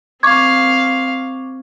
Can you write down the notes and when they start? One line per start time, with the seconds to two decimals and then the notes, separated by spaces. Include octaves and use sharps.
0.23 C4 F5 C#6 D6 G#6